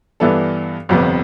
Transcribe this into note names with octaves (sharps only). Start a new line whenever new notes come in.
G2 E3 B3 D4 A4
G1 F2 C3 G3 B3